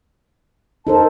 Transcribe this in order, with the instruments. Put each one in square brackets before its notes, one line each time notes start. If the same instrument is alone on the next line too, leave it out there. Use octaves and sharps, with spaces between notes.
[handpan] D#4 A4 C5 [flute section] A#4 A5